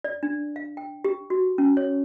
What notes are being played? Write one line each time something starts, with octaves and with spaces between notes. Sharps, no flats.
D5
D4
F5
G5
G4
F#4
C#4
C#5